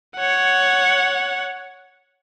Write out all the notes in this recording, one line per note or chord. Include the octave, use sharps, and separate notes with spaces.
C#5 F#5